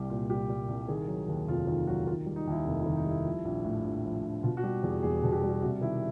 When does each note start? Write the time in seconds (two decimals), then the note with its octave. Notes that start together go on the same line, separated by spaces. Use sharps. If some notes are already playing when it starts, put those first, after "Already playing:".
Already playing: C2 G3 G4
0.10 A#2
0.30 C2 G4
0.50 G3
0.69 C2
0.88 D#3 G#4
1.08 F#3
1.28 D#2
1.48 F1 F4
1.67 D#3 F4
1.87 F#3 F#4
2.07 D#3 F4
2.26 G3
2.36 D#4
2.47 D#2 E4
2.66 F1 D#4
2.81 E4
2.86 D#3
2.96 D#4
3.06 G3 E4
3.25 F3
3.45 A#1
3.64 A2
3.84 A#1
4.05 F3
4.25 A#1
4.43 B2 F4
4.57 F#4
4.63 G3 G4
4.83 E2 G#4
5.03 E1 G#4
5.23 B2
5.32 G4
5.40 G3 G#4
5.49 G4
5.62 C3 F#4
5.81 D#3 E4